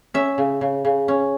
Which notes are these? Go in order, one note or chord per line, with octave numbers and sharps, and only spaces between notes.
C#4 E5
C#3
C#3
C#3
C#4